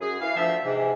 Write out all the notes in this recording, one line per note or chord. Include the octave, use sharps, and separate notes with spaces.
F#2 G#4
E3 F5
D2 F3 E5
G#2 C3 E3